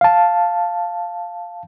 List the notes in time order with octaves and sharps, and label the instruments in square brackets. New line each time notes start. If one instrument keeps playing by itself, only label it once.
[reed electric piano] F5 A5